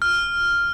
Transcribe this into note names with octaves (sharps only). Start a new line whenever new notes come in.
F6